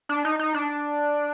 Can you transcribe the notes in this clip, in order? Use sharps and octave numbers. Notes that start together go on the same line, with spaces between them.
D4
D#4
D#4
D4